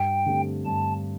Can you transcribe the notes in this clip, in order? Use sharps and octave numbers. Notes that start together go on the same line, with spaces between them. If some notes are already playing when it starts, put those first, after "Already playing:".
Already playing: G2 G5
D3 A3 C4 G4
G2 A5